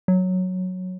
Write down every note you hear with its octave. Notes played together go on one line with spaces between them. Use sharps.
F#3